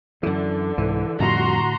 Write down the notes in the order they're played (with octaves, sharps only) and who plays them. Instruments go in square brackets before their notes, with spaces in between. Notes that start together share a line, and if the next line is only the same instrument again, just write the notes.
[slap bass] F#2 E3 [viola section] D3
[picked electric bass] C2 G#2 [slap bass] E3
[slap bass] F2 G3 [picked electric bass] A2 D3 [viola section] F#4 A#5 C6